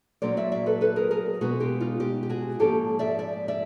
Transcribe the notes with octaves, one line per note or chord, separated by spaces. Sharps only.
A#2 F#3 A#3 C#4 C5 D5
D5 E5
D5 E5
A4 B4
A4 B4
G#4 A#4
G#4 A#4
B2 G#3 B3 F#4 G#4
F4 G4
D#4 F4
F4 G4
G4
F#4 G#4
G#2 F3 A#3 C#4 G4 A4
D5 E5
D5 E5
D5 E5